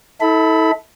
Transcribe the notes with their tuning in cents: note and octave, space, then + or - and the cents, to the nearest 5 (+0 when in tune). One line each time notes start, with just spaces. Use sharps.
E4 -40 A4 +0 B5 +10